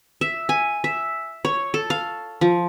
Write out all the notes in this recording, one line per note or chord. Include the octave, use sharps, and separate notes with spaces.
E5
G#5
E5
C#5
A4
F5
F3